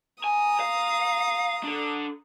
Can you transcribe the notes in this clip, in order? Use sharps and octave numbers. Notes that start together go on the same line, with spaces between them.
G#5 A#5 D#6
F5
D4 A4